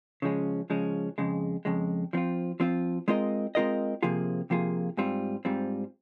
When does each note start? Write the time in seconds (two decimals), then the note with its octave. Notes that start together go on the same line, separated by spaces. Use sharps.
0.22 C#3 F3 G#3 C#4
0.70 C#3 F3 G#3 C#4
1.18 F2 C#3 G#3
1.65 F2 C#3 G#3
2.13 F3 C4 F4
2.60 F3 C4 F4
3.08 G#3 C4 F4 A#4 D#5
3.55 G#3 C4 F4 A#4 D#5
4.03 C3 F3 A#3 F4 G#4
4.50 C3 F3 A#3 F4 G#4
4.97 G#2 G3 C4 F4
5.45 G#2 G3 C4 F4